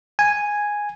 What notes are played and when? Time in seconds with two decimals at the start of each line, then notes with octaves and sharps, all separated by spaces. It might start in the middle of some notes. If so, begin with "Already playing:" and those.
0.19 G#5